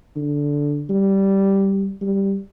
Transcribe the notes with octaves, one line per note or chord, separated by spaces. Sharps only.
D3
G3
G3